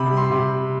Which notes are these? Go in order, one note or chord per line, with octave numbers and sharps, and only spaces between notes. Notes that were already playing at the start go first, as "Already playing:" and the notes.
Already playing: C3 B5
G3
C6
C3